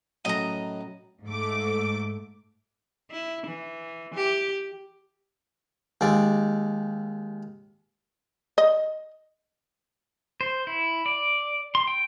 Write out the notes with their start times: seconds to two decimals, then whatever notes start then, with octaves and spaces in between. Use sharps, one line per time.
0.25 F#2 A2 F#3 D#5 A#5
1.25 G#2 A3 D6
3.11 E4
3.46 E3
4.14 G4
6.01 D#2 G#3 D5
8.58 D#5
10.41 C5
10.67 E4
11.06 D5
11.75 C6
11.87 G5